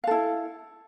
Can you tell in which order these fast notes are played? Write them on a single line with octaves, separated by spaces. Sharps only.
F5 A4 E4